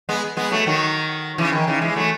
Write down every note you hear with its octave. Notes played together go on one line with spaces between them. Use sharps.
G#3 B3
G#3 B3
F#3 A3
D#3 F#3
C#3 E3
D#3
C#3 E3
E3 G#3
F#3 A3